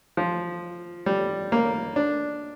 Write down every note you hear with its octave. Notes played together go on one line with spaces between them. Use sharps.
F3
G3
A#3
D4